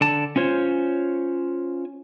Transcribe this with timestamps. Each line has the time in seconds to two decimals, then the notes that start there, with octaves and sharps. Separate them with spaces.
0.01 D3 A5
0.36 C#4 F4 C5 C#5